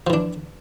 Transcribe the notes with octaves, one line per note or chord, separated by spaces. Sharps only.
E3 F3 D4